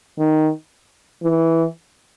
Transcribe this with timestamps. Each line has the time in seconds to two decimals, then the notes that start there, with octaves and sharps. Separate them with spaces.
0.19 D#3
1.23 E3